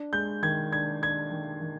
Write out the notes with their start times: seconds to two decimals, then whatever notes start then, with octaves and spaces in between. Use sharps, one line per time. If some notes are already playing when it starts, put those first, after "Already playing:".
Already playing: D4
0.13 G#3 G6
0.43 D#3 G#6
0.72 D4 G#6
1.02 D4 G#6
1.32 D#3
1.62 D#3